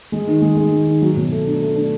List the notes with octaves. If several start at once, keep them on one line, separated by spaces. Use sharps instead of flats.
G#3
D#3
G#3
G#3
D#3
D#3
F#3
B2
A3
D4
A3
D4